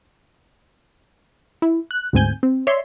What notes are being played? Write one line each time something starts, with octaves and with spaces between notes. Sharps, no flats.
E4
F#6
D2 G#2 C4 G#5 G6
C4
C#5 D5 E5 C6